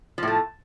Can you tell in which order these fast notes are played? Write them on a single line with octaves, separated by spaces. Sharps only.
F3 A2 A3